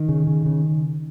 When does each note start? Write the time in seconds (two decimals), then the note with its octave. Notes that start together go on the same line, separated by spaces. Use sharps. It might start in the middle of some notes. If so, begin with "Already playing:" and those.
Already playing: D#3
0.09 C#3
0.27 C#3
0.46 C#3